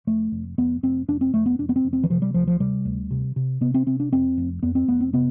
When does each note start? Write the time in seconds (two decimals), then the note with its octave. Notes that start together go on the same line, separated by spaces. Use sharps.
0.07 F1 A3
0.32 F1
0.58 F1 B3
0.83 F1 C4
1.08 F1 D4
1.21 C4
1.34 F1 A3
1.46 B3
1.59 F1 D4
1.69 B3
1.76 C4
1.84 F1
1.93 C4
2.04 E3
2.10 C3 F3
2.22 G3
2.34 D2 F3
2.47 F3
2.60 C3 G3
2.85 D2
3.11 C3
3.36 C3
3.61 C3 B3
3.74 C4
3.86 C3 C4
4.00 D4
4.12 F2 C4
4.37 F1
4.63 F2 B3
4.75 C4
4.88 F1 B3
5.01 C4
5.13 C3 B3